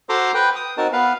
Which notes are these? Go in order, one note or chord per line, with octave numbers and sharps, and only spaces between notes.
F#4 A4 C5 A#5 C6 D6
B4 G5
D#6
C4 D#4 F#4 A#4 A5
B3 B4 F5